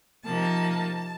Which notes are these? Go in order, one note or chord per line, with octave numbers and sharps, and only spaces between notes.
C3 F3 A#3 D#4 A5